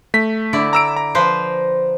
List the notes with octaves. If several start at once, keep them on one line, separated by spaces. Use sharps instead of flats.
A3 B6
D3 E4 D5
A#5 E6 D7
A#5
F3 B4 C5